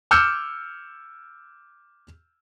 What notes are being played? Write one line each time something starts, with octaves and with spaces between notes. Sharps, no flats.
D6 E6 F6 G6 C#7 E7